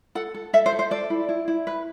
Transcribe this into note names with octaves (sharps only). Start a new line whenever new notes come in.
A4 F#5
A4
A4 E5
C5
A4
C5
A4 D5
E4
E4
E4
B4